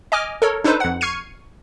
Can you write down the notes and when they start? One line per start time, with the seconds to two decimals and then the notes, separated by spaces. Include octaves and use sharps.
0.12 D#5 G#5 D6 F6
0.42 A4 A#4 C#5
0.64 D4 D#4 A4 B4 C5
0.80 F2 F#5
1.01 C#6 F6 G#6 C7 C#7 D#7